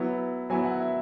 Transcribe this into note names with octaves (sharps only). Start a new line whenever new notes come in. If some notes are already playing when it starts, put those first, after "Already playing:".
Already playing: F#3 B3 E4
F#3 B3 E4 G#5
F#5
E5